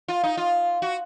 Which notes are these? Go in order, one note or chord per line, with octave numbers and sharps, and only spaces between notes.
F4
D#4
F4
F#4